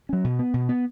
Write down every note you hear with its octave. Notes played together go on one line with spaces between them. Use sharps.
F#3 C#4
B2
B3
B2
B3